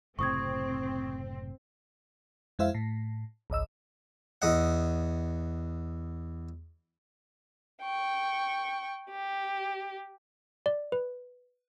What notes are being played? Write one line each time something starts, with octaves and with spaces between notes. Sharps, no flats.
F#1 A2 C3 C4 C#6 D#6 G#6
F2 G#3 E4 C5 E5 F5
A2
G#1 C#2 D#5 E6
E2 D#5 F#5
G5 C#6
G4
D5
B4